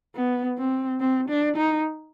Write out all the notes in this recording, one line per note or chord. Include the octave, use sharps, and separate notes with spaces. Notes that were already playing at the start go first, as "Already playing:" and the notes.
B3
C4
C4
D4
D#4